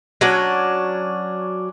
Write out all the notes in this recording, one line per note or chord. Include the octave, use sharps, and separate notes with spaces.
F#3 C#4 D4 D5